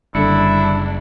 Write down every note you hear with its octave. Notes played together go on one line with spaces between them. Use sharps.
F#1 D3 G3 D4 E4 C#7